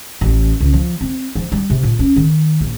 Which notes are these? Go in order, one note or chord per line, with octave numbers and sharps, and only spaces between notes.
A1
C#2
F3
C4
F3
G3
C3
A#2
C#4
D#3
A#1